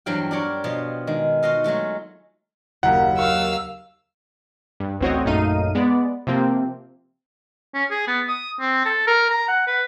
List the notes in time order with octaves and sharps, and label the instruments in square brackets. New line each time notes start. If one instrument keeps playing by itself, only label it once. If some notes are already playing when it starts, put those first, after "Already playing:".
[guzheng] E2 G2 F3 F#3 F5 G5
D4 F4 G4 A#4 C#5
B2 F3 F4
D#3 G#3
F4 F#4 D#5 F5
F#3 G#3 A3 F4
[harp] F#1 D#2 [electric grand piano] F#5
[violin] F5 E6 [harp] C#6 F6 C#7
[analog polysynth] G2
A1 D2 C4 F#4 C#5 D#5
A#1 F#2 A3 D#4 F5 D#7
G#3 B3 D5
C3 F3 A#3 C4
[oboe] C#4
G#4
B3
D#6
C4
A4
A#4
A#5
F#5
B4